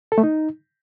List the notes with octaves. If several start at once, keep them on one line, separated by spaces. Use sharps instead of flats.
A4
A3
D#4